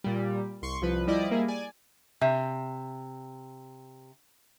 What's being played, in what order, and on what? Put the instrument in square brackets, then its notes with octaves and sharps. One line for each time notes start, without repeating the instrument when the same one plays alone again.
[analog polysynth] A#2 G3
C2 C6 C#6
C2 F3 B4
F3 G3 E4 D5 D#5
G3 A#3 E4 G#4
D5 G#5
[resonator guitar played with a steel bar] C3 [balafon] E5